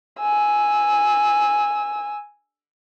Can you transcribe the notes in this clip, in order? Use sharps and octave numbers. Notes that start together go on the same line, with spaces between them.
G#5 E6